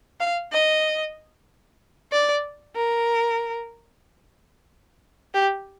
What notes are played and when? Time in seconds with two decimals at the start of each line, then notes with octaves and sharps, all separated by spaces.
0.20 F5
0.52 D#5
2.12 D5
2.76 A#4
5.34 G4